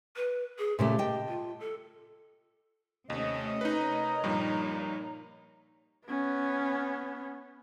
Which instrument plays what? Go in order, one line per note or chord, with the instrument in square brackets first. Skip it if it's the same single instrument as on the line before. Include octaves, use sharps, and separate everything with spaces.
[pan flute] B4
G#4
[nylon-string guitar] A#2 C#3 A3 [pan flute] G4
[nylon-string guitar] D#5 G5 A5
[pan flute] F4
A4
[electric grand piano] D#2 [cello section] C3 A3 C#4 [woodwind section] D#5
[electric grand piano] D#4 B4 [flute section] A#4 C#5 A#5
[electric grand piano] G2 F3 G3 [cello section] A#2 D#4
[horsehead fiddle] B3 C#4